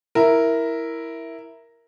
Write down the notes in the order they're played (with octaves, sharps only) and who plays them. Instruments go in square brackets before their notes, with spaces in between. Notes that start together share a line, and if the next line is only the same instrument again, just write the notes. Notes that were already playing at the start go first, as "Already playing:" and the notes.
[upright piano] E4 A#4